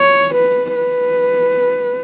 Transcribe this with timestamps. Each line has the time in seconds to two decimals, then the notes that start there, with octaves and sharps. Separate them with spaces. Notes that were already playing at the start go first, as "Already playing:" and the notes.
Already playing: C#5
0.35 B4
0.75 B4